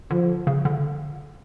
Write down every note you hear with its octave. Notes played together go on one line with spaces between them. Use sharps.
D3 F3
C#3
D3